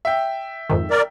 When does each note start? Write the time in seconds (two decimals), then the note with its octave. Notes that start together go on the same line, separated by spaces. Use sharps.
0.05 E5 G5
0.70 F2 G#2 D#3
0.90 A#4 D5